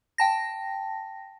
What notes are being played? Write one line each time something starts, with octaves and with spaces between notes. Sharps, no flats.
G5 A5 A#6